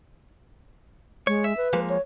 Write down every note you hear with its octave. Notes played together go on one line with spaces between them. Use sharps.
G#3 C#5
E5
B4
F3 G#3 A#3
C#5